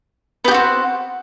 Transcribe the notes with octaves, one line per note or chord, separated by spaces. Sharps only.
B3 C4 F#4 G4